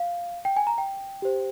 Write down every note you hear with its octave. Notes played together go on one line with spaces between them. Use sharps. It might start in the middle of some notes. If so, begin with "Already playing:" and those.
Already playing: F5
G5
G#5
A#5
G5
G4 C5